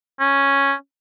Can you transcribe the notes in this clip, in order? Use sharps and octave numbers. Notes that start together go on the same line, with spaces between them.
C#4